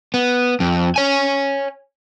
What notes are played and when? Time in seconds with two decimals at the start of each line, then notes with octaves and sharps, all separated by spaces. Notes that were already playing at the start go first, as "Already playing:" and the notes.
0.14 B3
0.60 F2
0.96 C#5 G#5